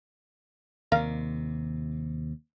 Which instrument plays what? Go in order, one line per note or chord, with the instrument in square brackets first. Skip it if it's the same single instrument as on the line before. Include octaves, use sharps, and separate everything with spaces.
[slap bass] D#2 C3 [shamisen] A#4 D5 F5